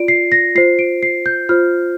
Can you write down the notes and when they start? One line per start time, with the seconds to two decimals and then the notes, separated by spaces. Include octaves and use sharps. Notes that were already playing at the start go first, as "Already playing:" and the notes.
Already playing: F4 D5 D7
0.08 C7
0.32 A#6
0.55 F4 C5 C7
0.79 D7
1.03 C7
1.26 G6
1.49 F4 C5 F6